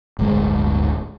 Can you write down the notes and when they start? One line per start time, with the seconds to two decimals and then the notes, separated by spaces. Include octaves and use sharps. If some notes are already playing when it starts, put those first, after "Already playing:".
0.19 D1 G1 D2 G#3